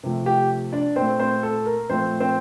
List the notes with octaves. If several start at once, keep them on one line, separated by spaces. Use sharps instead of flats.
C3 F3 A3
G4 G5
D4 D5
A#2 A3 C4 C5
C4 C5
A4
A#4
A#2 F3 A3 C4 C5
C4 C5